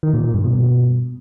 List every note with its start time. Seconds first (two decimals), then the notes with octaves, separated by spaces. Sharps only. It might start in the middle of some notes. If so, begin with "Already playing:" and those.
0.03 D#3
0.13 A#2
0.24 A#2
0.34 G2
0.44 B2